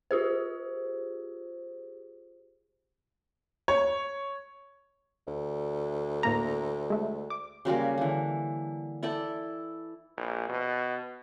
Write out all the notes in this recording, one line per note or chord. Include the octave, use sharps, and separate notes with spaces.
F4 G4 G#4 C5
C#5
D2
A2 A#3 A#5
G#3 A3
D6
C#3 F#3 G3 A#3
D3 E3
E4 A4 D5 G5
A#1
B2